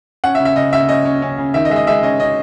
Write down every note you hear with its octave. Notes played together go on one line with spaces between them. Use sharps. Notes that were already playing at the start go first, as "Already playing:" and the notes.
C#4 F#5
E5
C#3
E5
C#3 D#5
C#3 E5
C#4 D#5
C#4
C#4
C#3
D#3 E5
D#5
G#3 E5
D#5
G#3 E5
C#4 D#5
C#4 D#5